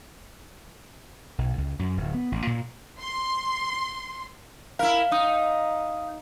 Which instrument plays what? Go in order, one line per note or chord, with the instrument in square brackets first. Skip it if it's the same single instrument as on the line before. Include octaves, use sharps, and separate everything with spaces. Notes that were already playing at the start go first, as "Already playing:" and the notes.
[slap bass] B1
C#2
F#2
D1
B3
A1
A#2
[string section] C6
[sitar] E4 A#4 [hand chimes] F5
[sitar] D#4 [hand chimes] F5 D#6